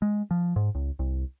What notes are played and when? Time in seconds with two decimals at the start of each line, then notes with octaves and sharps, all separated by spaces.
0.02 G#3
0.31 F3
0.56 G#2
0.75 C#2
0.99 C2